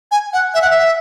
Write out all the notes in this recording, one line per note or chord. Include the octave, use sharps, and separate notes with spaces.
G#5
F#5
E5
F#5
E5